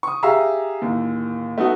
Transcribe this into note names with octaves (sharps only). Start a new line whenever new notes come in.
C#6 D#6
G4 G#4 E5 F5 A#5 E6
D1 D#2
A3 B3 D#4 F#4